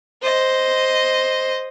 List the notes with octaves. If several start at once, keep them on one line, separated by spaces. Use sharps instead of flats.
C5 D#5